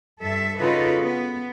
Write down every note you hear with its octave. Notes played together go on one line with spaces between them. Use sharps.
G2 A4 E5
C#3 D#4 F4 F#4 A4 B4
B3